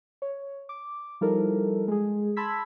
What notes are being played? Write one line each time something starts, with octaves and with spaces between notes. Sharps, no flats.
C#5
D6
F3 G3 D#4 E4 A4 A#4
G#3 G#4
A5 B5 C6 E6 G#6 B6